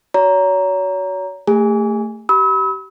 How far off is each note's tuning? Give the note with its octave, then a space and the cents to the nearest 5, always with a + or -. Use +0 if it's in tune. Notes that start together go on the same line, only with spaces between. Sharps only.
F#4 +0 C#5 +35 A#5 +0
A3 +25 G#4 -45 G#5 +0
G4 -30 B5 +0 E6 -40